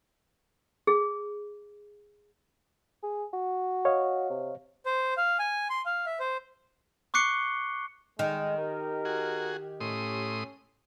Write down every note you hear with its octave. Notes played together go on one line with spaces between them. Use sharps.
G#4
G#4
F#4
C#5 D#5 F5
C3
C5
F5
G#5
C6
F5
E5
C5
C#6 D6 F#6 C7 C#7 G7
D#3 G#3
G4 A#4
F#4 G#4
A2 C#4 C6 D#6